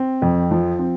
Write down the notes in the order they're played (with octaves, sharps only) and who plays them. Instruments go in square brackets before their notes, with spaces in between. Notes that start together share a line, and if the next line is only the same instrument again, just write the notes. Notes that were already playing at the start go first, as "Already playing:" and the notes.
Already playing: [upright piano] C4
F2
F3
C4